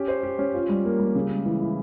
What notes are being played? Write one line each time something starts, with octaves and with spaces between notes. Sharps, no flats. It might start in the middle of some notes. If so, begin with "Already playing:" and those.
Already playing: C#4 G4
C5
G4
C#4
F4
G3
A#3
G3
C#3
G#3
E3
E4